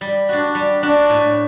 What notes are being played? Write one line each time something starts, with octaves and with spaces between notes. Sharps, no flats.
G3
D4 F#4
G3
D4 F#4
A2